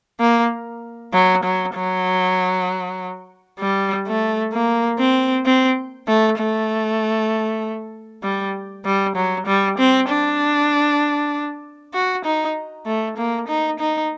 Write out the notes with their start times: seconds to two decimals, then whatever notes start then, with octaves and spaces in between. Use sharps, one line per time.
0.20 A#3
1.13 F#3
1.44 F#3
1.75 F#3
3.60 G3
4.07 A3
4.53 A#3
4.99 C4
5.45 C4
6.08 A3
6.38 A3
8.23 G3
8.85 G3
9.16 F#3
9.46 G3
9.78 C4
10.09 D4
11.94 F#4
12.25 D#4
12.86 A3
13.17 A#3
13.48 D#4
13.79 D#4